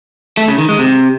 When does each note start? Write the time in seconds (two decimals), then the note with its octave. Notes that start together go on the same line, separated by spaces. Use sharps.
0.37 A3
0.48 C#3
0.58 D#3
0.69 G#3
0.79 C3